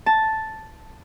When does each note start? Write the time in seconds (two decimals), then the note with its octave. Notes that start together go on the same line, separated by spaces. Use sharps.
0.06 A5